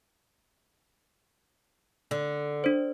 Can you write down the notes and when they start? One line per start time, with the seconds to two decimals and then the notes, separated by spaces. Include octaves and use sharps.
2.11 D3
2.64 D4 C5